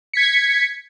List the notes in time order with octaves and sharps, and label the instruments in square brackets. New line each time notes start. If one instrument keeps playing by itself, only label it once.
[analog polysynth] G#6 B6 C#7